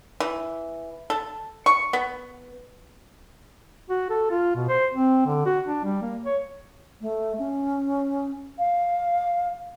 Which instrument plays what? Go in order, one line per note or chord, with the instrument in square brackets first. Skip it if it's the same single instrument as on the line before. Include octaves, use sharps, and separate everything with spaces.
[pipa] E3
A4
C#6
B3
[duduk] F#4
A4
F4
B2
C5
C4
D3
F#4
D4
G3
A#3
C#5
[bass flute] A3
C#4
F5